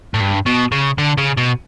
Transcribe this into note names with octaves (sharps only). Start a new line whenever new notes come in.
A2
G2
B2
C#3
D3
C#3
B2